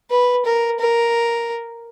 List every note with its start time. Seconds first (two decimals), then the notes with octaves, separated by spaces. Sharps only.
0.11 B4
0.45 A#4
0.80 A#4